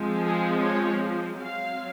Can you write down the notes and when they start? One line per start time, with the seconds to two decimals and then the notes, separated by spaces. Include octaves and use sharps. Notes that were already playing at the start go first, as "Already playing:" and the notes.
Already playing: F3 G#3 C4
0.22 G#4
0.60 C#5
1.39 F#3 C4 F5